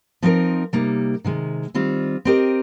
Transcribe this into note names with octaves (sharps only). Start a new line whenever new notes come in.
F3 C4 D#4 A#4 D#5
C3 G3 A#3 D#4
C3 D#3 G#3
D#3 G3 C4 F4
C4 G4 A#4 D#5